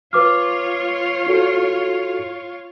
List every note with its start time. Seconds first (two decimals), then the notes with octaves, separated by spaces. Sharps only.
0.13 F4 B4 C#5 D6 F6
1.26 E4 F#4 A4